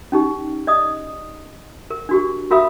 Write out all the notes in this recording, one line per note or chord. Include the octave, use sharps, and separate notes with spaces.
C#4 D#4 G4
D5 D#5 D#6
A#4
D4 F#4 G4
F#4 A#4 E5 F5 B5 D#6